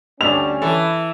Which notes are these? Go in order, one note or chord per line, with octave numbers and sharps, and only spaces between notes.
D2 D3 G3 C#4 D4 F7
E3 A4